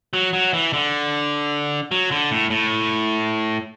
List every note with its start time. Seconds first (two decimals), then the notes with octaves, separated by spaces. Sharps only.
0.13 F#3
0.33 F#3
0.53 E3
0.73 D3
1.91 F#3
2.11 D3
2.31 A2
2.50 A2